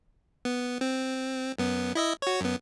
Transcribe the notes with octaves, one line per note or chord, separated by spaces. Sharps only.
B3
C4
F#2 B3
E4 D#5 E5
F#4 C#5
F#2 B3